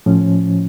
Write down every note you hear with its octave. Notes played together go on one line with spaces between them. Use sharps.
A2 F3 C#4